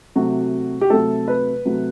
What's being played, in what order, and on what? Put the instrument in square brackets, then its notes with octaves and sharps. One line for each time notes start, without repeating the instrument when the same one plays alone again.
[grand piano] C3 F#3 A3 F#4
G4
C3 F#3 A3 A4
B4
C3 F#3 A3